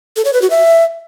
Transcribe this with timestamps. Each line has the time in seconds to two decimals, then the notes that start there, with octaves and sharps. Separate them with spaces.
0.16 A4
0.25 C#5
0.33 B4
0.42 F#4
0.50 E5